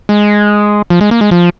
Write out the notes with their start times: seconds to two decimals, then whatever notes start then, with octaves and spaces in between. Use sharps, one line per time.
0.09 G#3
0.90 F3
1.01 G#3
1.11 A#3
1.21 G#3
1.31 F3